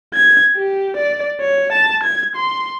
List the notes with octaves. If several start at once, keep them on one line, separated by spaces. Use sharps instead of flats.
G#6
G4
D5
C#5
A5
G#6
C6